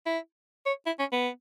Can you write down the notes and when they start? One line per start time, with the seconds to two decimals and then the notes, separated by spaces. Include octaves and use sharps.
0.06 E4
0.66 C#5
0.86 E4
0.99 C#4
1.13 B3